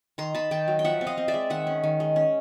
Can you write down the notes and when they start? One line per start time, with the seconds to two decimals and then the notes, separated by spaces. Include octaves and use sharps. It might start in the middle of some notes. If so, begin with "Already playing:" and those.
0.18 D#3 A#5 C6
0.35 D#3 A5 B5
0.51 D#3 G5 A5
0.68 F#3
0.79 G5
0.85 F3 E5 F#5
1.01 C4
1.07 D#5 F5
1.17 C4
1.28 D5 E5
1.34 G#3
1.50 D#3 E5 F#5
1.67 C#4
1.84 D#3
2.00 G#3
2.16 C#4